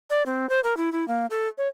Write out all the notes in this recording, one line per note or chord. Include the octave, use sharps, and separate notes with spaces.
D5
C4
C5
A#4
E4
E4
A#3
A4
C#5